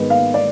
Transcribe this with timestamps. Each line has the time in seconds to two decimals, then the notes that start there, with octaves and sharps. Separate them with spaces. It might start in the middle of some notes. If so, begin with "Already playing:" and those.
Already playing: G#2 D#3 G#3 B3
0.10 F5
0.34 D5